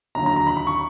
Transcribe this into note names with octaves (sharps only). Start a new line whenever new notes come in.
D#2 D3 F#3 A#5
A#5
A#5
B5
B5
C#6